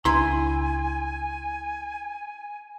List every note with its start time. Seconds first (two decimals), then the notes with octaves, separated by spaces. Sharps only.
0.05 C#2 D4 E4 G#5 A#5 C6